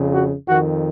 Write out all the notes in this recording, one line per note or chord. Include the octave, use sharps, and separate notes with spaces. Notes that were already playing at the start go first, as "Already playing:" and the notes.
Already playing: F2 C#3
F#4
F2 D#3 F#4